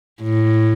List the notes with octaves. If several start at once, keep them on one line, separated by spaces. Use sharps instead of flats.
A2